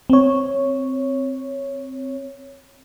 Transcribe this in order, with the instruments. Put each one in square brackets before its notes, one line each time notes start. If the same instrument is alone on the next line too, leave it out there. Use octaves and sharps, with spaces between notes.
[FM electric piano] C4 C#5